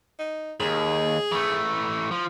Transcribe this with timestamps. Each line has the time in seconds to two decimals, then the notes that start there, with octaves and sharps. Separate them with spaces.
0.19 D#4
0.60 D#2 G#4
1.32 E3 A3
2.11 F3